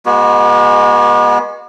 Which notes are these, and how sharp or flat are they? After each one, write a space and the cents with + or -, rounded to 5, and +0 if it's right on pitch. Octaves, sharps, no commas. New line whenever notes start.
G#3 -15 B3 -45 F#4 +0